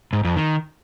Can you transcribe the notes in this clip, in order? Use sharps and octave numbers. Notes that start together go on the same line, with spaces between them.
G#2
F2
D#3